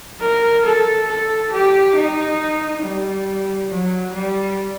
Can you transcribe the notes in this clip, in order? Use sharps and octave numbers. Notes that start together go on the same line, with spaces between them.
A#4
A4
A4
G4
D#4
G3
F#3
G3